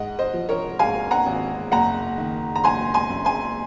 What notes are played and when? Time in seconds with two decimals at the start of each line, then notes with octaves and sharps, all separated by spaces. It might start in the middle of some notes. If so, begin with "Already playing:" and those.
Already playing: G#2 D#5 F#5
0.19 C5 D#5
0.33 F3
0.49 A#4 C#5
0.79 G#2 F5 G#5
1.11 F#5 A#5
1.26 G#1
1.72 F#1 F#5 A#5
2.18 D#3
2.56 A#5
2.64 F#1 G#5 C6
2.94 G#5 C6
3.10 F#2
3.25 G#5 C6